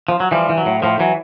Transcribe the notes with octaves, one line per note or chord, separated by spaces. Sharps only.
F3
F#3
E3 F3 G3
E3
F#3
A2
A2 F3
E3 F#3